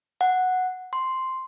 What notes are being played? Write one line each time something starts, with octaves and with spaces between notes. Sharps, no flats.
F#5
C6